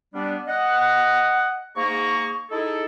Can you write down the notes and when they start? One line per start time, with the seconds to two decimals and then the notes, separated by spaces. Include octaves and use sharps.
0.14 G3 B3 D4
0.47 D#5 F#5
1.76 G#2 A#3 G#4 A#5 C#6
2.50 D#4 E4 G#4 A4